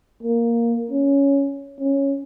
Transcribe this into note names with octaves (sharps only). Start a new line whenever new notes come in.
A#3
C#4
C#4